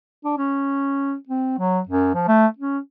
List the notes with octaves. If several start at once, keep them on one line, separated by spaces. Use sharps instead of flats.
D4
C#4
C4
F#3
F#2
F3
A3
C#4